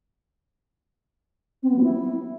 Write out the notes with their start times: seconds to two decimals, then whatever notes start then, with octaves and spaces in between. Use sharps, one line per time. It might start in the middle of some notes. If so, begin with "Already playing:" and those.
1.62 C4
1.69 B3
1.76 F#3
1.83 E4